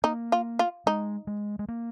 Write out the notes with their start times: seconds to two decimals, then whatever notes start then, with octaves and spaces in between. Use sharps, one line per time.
0.04 A#3 D#4
0.32 F4
0.59 F4
0.86 G#3 D#4
1.27 G#3
1.59 G#3
1.68 A#3